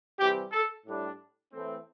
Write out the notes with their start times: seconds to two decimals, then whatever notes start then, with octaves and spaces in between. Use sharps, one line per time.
0.19 C3 E3 G3 C4 G4
0.52 A4
0.87 A2 G3 D4
1.53 A2 E3 A3 C4